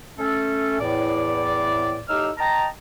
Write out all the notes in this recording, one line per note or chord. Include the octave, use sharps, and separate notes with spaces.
A3 C#4 A4
E2 A2 D5
A2 D#4 G4 E6 F6
D#5 G5 A5 A#5